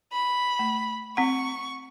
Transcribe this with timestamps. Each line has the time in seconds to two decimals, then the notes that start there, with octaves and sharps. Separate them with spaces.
0.13 B5
0.59 A3
1.17 C4 F#5 C#6